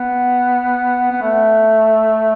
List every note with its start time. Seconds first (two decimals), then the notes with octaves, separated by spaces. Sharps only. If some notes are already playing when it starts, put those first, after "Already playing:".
Already playing: B3
1.11 B3
1.22 A3